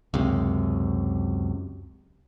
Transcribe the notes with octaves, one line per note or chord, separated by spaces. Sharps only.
C#2 F#2 C3